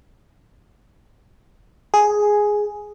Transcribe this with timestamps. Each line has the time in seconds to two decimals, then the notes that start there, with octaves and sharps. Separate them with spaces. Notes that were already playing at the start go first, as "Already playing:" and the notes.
1.94 G#4